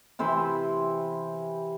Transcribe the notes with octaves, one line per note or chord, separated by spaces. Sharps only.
C3 E3 C5 B5